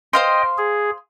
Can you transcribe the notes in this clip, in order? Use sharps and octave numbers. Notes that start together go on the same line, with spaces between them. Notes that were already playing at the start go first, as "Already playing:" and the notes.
C5 D#5 F5 G5 C6
G#4